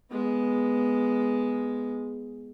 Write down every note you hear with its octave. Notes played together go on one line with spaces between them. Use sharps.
G#3 B3